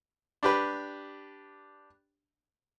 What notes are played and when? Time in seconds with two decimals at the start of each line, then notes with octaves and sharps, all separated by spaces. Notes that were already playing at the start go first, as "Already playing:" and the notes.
0.43 D4 G4 B4